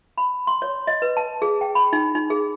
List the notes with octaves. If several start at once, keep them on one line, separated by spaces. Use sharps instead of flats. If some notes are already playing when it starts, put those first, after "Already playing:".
B5
C6
C#5
D#5
B4
A5
G#4
G5
B5
D#4
D#4
G#4